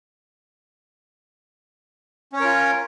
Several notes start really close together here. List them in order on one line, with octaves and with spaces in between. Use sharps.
C#4 C#5 A#4 F4